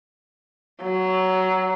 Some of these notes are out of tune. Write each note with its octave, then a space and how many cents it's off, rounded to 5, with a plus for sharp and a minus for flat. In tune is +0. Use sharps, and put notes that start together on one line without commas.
F#3 +15